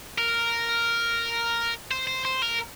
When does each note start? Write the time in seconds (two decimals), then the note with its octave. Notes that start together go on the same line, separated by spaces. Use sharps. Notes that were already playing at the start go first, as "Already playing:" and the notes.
0.18 A#4
1.91 C5
2.07 C5
2.25 C5
2.42 A#4